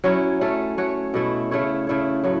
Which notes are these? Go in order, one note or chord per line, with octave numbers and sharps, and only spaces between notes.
F#3 C#4 E4 C#5
A3 C#4 A4
A3 F#4 C#5
B2 A3 E4
C#3 A3 E4 C#5
C#3 A3 E4 C#5
A2 F#3 A3